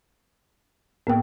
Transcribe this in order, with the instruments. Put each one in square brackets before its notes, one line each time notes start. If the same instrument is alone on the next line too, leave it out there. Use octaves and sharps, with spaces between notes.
[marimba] A2 G5 [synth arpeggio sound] A#3 B3 A#4